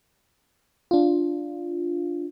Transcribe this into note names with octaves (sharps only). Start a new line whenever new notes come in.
D4 F4